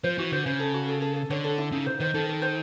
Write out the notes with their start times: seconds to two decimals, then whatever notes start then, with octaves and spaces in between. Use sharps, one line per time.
0.04 F3 C5
0.18 E3 F#4
0.32 D3 C5
0.46 C#3 C5
0.60 A4
0.74 F#4
0.88 A4
1.02 A4
1.16 A4
1.30 D3 C#5
1.44 A4
1.58 E4
1.72 C#3 D#4
1.86 C5
2.00 D#3 C5
2.14 D#3 A4
2.29 A4
2.42 C5